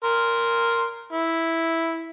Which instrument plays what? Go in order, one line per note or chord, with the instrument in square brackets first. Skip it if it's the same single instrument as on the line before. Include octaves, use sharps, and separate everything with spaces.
[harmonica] A#4 C6
E4